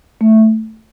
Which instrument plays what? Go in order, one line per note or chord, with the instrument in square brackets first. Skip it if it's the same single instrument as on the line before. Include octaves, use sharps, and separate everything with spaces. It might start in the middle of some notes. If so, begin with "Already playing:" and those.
[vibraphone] A3